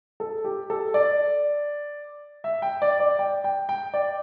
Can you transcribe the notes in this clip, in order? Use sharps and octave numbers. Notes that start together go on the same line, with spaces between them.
A4
G4
A4
D5
E5
G5
D5
D5
G5
G5
G5
D5